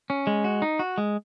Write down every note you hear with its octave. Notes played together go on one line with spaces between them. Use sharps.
C#4
G#3
F#4
D#4
F#4
G#3